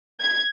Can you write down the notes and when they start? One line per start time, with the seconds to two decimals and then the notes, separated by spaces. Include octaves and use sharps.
0.20 G#6